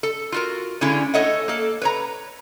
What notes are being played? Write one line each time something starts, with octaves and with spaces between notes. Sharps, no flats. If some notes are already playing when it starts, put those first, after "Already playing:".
A4
F4 F#4 A#4
D3 G#3 C#4 E4 F4
A3 A4 C#5 D#5 E5 F#5
A#3 A4
B4 C#5 A#5